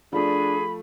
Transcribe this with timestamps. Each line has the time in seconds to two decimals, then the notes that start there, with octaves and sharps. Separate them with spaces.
0.13 F3 A3 D4 G#4 B5